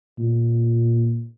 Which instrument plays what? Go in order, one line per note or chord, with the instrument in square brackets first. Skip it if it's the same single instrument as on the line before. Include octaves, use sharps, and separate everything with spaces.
[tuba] A#2